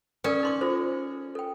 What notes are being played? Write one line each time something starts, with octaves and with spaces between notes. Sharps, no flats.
C#4 A4 A#4 D5
D#4 C6 D6
F4 A4 C5
A4 G5